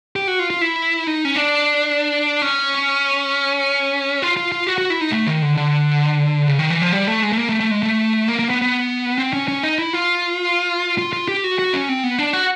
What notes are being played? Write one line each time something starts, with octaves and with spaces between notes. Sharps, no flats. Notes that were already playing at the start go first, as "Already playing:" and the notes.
G4
F#4
F4
F4
E4
D#4
C#4
D4
C#4
F4
F4
F4
F#4
F#4
E4
D#4
A3
D#3
D3
D3
C#3
D#3
E3
F3
G3
A3
G#3
A3
A#3
A3
A3
G#3
A3
A#3
A#3
B3
B3
C4
C#4
C#4
D#4
E4
F4
F4
F4
G4
F#4
F#4
C#4
C4
B3
D4
F#4